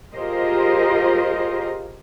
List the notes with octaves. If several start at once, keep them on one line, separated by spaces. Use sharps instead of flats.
F4 G4 G#4 A#4 C5 D#5